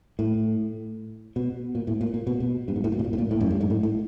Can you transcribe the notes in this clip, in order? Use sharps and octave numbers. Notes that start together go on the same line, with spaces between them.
A2
B2
A#2
A2
A#2
A#2
B2
B2
G2
G#2
A2
A#2
B2
A#2
A2
A#2
A2
F#2
G2
G#2
A2
A2